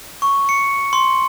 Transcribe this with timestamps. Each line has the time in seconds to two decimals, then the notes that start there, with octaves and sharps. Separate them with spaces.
0.22 C#6
0.49 C#7
0.93 C6